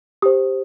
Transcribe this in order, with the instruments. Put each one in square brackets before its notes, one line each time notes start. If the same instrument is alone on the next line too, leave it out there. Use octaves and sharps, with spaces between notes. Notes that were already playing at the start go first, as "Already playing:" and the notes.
[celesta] G4 C5 D#6